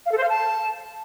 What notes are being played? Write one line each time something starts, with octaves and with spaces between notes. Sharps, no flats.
F5
A4
C5
F5
A5